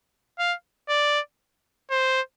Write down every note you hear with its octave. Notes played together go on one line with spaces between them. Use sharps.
F5
D5
C5